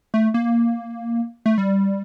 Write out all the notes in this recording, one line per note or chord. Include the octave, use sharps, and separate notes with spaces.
A3
A#3
A3
G3